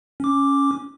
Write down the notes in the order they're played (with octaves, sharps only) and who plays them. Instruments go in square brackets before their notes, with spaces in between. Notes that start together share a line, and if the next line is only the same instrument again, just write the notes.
[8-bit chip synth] C#4 D6